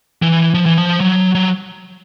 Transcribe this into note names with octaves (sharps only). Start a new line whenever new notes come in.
E3
F3
E3
F3
F#3
F#3